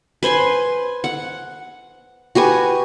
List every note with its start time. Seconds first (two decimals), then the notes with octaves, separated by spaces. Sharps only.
0.23 B4 C5 G#5 C6
1.04 F#5
2.35 F#4 G4 B4 G#5